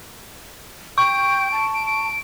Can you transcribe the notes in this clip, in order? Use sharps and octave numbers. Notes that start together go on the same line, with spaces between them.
G5 C#6 D7
A5
D7
D7